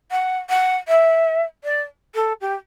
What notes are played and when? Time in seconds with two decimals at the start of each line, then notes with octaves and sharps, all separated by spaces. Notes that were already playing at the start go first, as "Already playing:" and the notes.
0.11 F#5
0.50 F#5
0.88 E5
1.64 D5
2.15 A4
2.41 G4